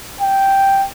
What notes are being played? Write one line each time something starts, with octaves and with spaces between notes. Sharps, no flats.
G5